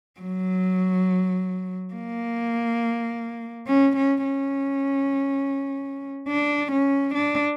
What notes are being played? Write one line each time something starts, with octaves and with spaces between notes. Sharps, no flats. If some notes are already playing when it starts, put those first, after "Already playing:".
F#3
A#3
C#4
C#4
C#4
D4
C#4
D4